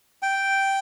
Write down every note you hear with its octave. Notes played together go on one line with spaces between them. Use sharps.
G5